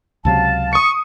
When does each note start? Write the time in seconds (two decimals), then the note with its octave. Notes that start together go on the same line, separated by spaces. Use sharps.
0.25 C#2 C3 F#3 F5 A5
0.73 C#6 D#6 C#7